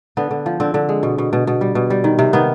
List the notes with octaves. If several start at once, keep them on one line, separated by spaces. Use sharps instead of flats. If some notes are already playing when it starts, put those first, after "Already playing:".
D3 B3
D3
F3
D3 C4
D3
G#3
B2
B2
B2
B2
G3
B2
G3
D#3
C3
D#3 B3